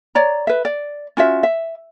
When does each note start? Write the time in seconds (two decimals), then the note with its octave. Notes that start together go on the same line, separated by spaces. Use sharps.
0.15 C#5 D5 A#5
0.47 B4 E5
0.65 D5
1.17 C#4 F4 F#4 E5
1.43 E5